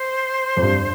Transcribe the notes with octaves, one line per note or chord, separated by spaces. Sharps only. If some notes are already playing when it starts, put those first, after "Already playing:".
Already playing: C5
F2
G2